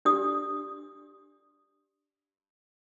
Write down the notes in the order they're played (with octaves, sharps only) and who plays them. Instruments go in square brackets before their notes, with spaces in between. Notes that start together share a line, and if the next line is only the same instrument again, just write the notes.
[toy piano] D4 G4 D5 D#6